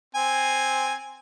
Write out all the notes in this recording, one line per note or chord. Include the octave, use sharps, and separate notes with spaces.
C4 G#5